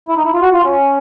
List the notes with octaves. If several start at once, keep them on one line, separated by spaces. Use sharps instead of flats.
E4
D#4
E4
F4
F#4
F4
C#4